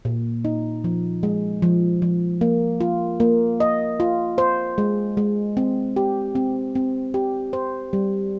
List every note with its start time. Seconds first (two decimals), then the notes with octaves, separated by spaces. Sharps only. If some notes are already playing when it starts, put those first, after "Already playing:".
0.05 A#2
0.45 D#4
0.84 F3
1.23 G#3
1.62 F3
2.02 F3
2.41 A#3
2.81 F4
3.20 A#3
3.60 D#5
4.00 F4
4.38 C5
4.78 G#3
5.17 G#3
5.57 C4
5.96 G4
6.35 C4
6.75 C4
7.14 G4
7.53 C5
7.93 G3